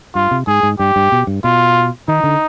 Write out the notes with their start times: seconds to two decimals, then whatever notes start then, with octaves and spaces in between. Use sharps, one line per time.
0.15 G2 F4
0.31 C3
0.47 G#2 G#4
0.63 G#2
0.79 G2 G4
0.96 G2
1.12 B2
1.27 G2
1.44 B2 F4
2.08 D#3 D#4
2.24 D3